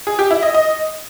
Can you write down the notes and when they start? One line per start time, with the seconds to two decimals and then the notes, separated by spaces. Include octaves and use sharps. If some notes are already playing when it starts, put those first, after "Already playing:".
0.07 G#4
0.19 G4
0.31 E4
0.43 D#5
0.54 D#5